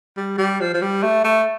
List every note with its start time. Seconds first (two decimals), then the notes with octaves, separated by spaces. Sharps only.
0.17 G3
0.38 G3
0.60 F3
0.74 F3
0.82 G3
1.03 A3
1.25 A3